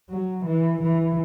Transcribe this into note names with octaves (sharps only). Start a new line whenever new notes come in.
F#3
E3
E3